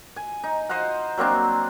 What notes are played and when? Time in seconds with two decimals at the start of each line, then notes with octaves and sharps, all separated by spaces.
0.16 G#5
0.44 D#4
0.69 C5 D#5 F5 F#5
1.18 F#3 A#3 C4 D4